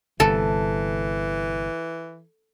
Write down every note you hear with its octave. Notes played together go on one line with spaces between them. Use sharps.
G1 C3 E3 A4